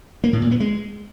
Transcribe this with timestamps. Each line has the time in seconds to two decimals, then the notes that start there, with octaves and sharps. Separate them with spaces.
0.24 A#3
0.33 A2
0.42 A#2
0.51 B3
0.60 G#3